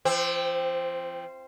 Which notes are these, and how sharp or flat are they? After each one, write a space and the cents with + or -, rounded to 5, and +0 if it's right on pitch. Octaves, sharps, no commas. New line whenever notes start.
F3 -35 C4 +0